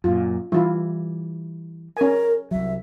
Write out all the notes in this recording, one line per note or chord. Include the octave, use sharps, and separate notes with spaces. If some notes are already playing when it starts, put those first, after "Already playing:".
F#2 A#2 F4
E3 G3 E4 F4
C#4 A#4 G#5
C2 F#3 E5